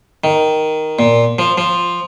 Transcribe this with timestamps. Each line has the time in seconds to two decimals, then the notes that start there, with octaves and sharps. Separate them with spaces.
0.24 D#3
0.99 A#2
1.39 F3
1.58 F3